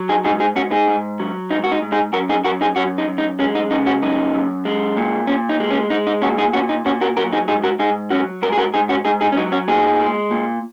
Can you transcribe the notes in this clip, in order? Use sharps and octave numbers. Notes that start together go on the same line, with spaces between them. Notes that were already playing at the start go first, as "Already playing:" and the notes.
Already playing: F#3
D#4 G#4
G#2 D#4 G#4
D#4 G#4
G#2 C#4 F#4
D#4 G#4
G#2
F#3
G#2 D#4
F#4
D#4
G#2
D#4 G#4
F#2 F#4 A#4
D#4 G#4
F#2 F#4 A#4
D#4 G#4
F#2 C#4 F#4
D#4
F#2
D#4
G#3 C#4
D#4
C#3 D#4
C#4 F#4
F#2 D#4
F#2
G#3
A#2
A#2 C#4
D#4
G#3
C#4
G#3 D#4
D#4
A#2 C#4 F#4
D#4 G#4
A#2 C#4 F#4
D#4
A#2 C#4 F#4
F#4 A#4
F#3 F#4 A#4
D#4 G#4
G#2 D#4 G#4
F#4 A#4
G#2 D#4 G#4
F#3 C#4 F#4
G#2 F#4 A#4
G#4
F#4 A#4
G#2 D#4 G#4
C#4 F#4
G#2 D#4 G#4
D#4 G#4
C#4
F#3 D#4
C#4 F#4
A#2 D#4 G#4
G#3
A#2